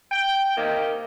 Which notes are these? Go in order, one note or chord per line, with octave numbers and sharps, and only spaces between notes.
G5
C3 D#3 A#3 G4